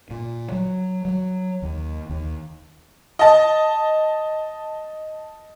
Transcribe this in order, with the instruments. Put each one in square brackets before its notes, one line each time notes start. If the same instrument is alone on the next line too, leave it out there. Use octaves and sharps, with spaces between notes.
[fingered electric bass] A#2
F#3
F#3
D#2
D#2
[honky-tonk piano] D#5 A5